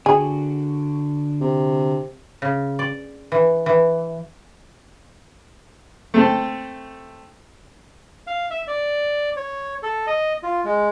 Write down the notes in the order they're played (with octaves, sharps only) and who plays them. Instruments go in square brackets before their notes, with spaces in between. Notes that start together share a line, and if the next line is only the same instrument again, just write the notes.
[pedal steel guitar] D3 F#4 [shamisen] G#4
[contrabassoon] C3
[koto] C#3
D5
E3
E3
[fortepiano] A3 C4 A4
[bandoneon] F5
E5
D5
C#5
A4
D#5
F4
G#3